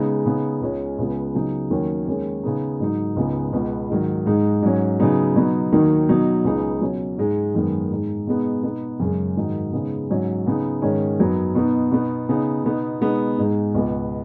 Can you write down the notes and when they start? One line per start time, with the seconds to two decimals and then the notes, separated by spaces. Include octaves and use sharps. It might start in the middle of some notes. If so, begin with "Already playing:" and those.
Already playing: C#3 G#3 B3 D#4
0.25 C#3 B3 D#4
0.62 C#2 C#3 G#3 C#4
0.98 C#2 C#3 B3
1.35 C#3 F#3 B3 D#4
1.70 D#2 D#3 F#3 C#4
2.08 D#2 D#3 G#3 C#4
2.43 C#3 B3 D#4
2.80 G#2 F#3 D#4
3.16 C#2 C#3 G#3 B3 D#4
3.53 C#2 B2 B3
3.90 G#2 D#3 F#3
4.26 G#2 G#3 D#4
4.63 G#2 F#3 C#4
5.00 C#3 F#3 B3 D#4
5.35 B2 F#3 B3 D#4
5.72 D#2 D#3 F#3 D#4
6.09 B2 F#3 D#4
6.44 C#2 C#3 B3 D#4
6.81 B2 F#3 C#4
7.18 G#2 G#3 D#4
7.55 F#2 D#3 G#3 B3
7.91 G#2 G#3 D#4
8.27 B2 G#3 B3 D#4
8.63 B2 B3 D#4
9.00 F#2 C#3 G#3
9.37 G#2 D#3 F#3 D#4
9.73 C#3 G#3 B3 D#4
10.10 G#2 F#3 C#4
10.46 C#3 B3 D#4
10.82 G#2 D#3 G#3 C#4
11.19 F#2 F#3 B3 D#4
11.55 B2 B3 D#4
11.91 B2 B3 D#4
12.29 C#3 B3 D#4
12.64 B2 B3 D#4
13.01 B2 G#3 B3 D#4
13.38 G#2 G#3 D#4
13.74 C#2 B2 B3